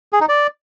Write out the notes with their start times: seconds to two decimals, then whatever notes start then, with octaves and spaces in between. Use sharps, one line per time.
0.13 G#4
0.21 D#4
0.29 D5